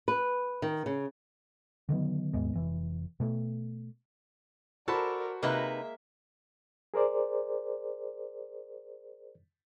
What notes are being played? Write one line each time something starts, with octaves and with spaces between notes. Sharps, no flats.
B4
D#3
C#3
D3 D#3 F#3 B3
D#2 G#2 G#3 B3
F1 E3
B2 A3
F#4 A4 A#4 C5 D5 A5 B5
C3 G#3 A#3 D#4 B4 E5
G#4 A#4 C5 D5